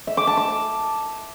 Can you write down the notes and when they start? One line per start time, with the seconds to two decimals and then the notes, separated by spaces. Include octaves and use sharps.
0.07 E5
0.17 D6
0.27 A5
0.37 D6